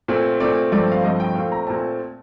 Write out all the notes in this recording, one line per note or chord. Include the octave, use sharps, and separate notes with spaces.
A#2 A3 C4
A#2 A3 C4 D5
G2 F3 A3 C4 D5
F5
G2 F3 A3 C4 D#5
G5
A#2 A3 C4 F5
A#5
A#2 A3 C4 A5